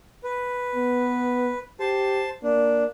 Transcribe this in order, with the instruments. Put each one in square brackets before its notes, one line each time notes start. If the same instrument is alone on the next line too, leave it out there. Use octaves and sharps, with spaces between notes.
[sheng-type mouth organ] B4
[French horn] B3
[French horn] G4 [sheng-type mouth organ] C5 A5
[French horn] A#3 [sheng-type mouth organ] D4